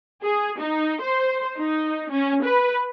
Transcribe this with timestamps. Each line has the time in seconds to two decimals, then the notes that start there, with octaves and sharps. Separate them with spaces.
0.23 G#4
0.60 D#4
1.01 C5
1.57 D#4
2.11 C#4
2.45 B4